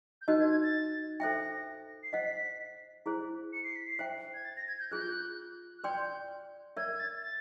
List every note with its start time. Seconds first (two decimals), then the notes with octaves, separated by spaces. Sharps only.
0.21 G6
0.28 D#4 F#4 A#4 D#5 F#6
0.39 G#6
0.51 G#6
0.63 A6
1.20 A4 C5 E5 G5 A#6
2.03 C7
2.13 C5 D#5 F#5 B6
3.06 E4 G#4 C5
3.53 C#7
3.63 C7
3.75 B6
3.87 C7
3.99 C5 E5 G5
4.34 G#6
4.45 A6
4.57 A#6
4.68 G#6
4.79 G6
4.91 F4 G#4 B4 F#6
5.01 G6
5.10 F#6
5.78 F#6
5.84 B4 D5 G5 C6 G6
6.77 A#4 C#5 E5 G#6
6.93 G#6
6.99 A6
7.22 A6